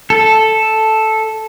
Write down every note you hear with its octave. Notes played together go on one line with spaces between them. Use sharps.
A4